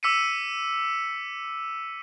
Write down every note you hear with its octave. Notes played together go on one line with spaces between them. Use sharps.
D6 E6 B6 C#7 D#7